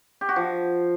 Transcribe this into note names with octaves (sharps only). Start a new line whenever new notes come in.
G4
F#4
F3